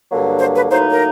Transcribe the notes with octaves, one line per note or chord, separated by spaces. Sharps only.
G2 D3 F#3 A#3
C5
B4
A2 F#3 A#3 D#4 C5
B4
A#4